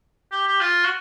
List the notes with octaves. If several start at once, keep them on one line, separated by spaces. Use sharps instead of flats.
G4
G4
F4
F#4